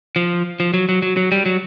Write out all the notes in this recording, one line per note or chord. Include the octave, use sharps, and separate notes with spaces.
F3
F3
F#3
F#3
F#3
F#3
G3
F#3